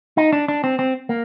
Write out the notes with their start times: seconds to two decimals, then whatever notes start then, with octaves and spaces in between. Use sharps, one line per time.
0.17 D#4
0.33 D4
0.48 D4
0.64 C4
0.79 C4
1.09 A#3